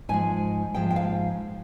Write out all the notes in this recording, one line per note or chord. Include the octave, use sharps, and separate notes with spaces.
G#2 F3 G#3 G#5
G#2 F3 G#3 G5
G5
F5